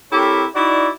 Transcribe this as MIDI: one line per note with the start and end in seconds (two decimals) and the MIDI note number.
0.11 0.44 60
0.11 0.44 64
0.11 0.44 67
0.11 0.44 69
0.11 0.44 70
0.11 0.44 73
0.55 0.88 63
0.55 0.88 64
0.55 0.88 66
0.55 0.88 74